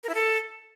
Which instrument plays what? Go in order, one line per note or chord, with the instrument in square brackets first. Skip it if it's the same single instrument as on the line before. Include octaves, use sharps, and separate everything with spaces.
[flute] A#4
E4
A4